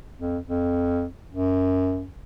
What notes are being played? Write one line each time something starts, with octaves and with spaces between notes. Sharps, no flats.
F2
F2
F#2